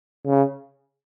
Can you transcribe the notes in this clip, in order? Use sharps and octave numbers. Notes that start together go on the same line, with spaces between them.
C#3